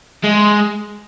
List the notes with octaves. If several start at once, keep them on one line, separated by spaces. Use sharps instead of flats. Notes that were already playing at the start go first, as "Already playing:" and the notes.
G#3